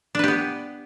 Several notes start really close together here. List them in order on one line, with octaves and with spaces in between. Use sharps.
D4 B4 G4 B3